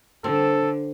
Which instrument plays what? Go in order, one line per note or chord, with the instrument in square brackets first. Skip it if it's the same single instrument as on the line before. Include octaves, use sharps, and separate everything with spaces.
[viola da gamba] D3 [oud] C4 [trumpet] A4